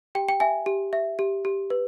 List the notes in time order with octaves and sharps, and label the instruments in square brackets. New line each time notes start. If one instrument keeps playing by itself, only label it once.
[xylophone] G4 G5
G5
E5 G#5
G4
E5
G4
G4
B4